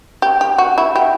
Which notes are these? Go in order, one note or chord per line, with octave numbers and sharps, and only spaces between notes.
G4
G4
F#4
E4
G4